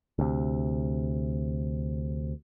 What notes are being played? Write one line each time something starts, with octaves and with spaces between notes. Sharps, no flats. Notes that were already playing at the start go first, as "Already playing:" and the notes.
D2 C3